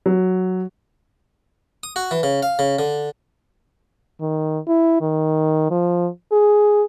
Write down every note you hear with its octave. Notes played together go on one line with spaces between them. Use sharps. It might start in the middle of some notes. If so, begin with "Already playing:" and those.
F#3
D#6
F#4
E3
C#3
F5
C#3
D3
D#3
E4
D#3
F3
G#4